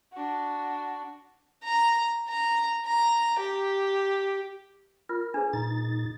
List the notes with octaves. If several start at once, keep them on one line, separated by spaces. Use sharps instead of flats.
D4 F#4
A#5
A#5
A#5
G4
F4 A#4
D4 G#4 B4
A#2 D#4 A6